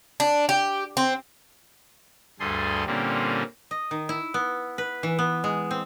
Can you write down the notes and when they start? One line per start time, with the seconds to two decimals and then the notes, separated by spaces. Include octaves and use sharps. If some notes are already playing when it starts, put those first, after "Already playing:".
0.20 D4
0.49 G4
0.97 C4
2.40 D2 G2 G3 G#4 A4 C6
2.87 A#2 D3 G3 A#3 C4 C#4
3.71 D#5
3.91 D#3
4.09 E4
4.34 B3
4.78 B4
5.03 E3
5.19 B3
5.44 G#3
5.71 C4